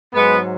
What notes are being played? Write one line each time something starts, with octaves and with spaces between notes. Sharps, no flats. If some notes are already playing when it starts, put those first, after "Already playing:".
G#2 F#3 G#3 B3